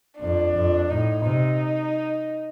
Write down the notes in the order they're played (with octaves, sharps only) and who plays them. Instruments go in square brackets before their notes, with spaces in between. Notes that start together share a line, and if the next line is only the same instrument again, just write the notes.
[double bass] F2 [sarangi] D4
[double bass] F2
[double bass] A2 [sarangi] D#4
[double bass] C3 [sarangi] D#4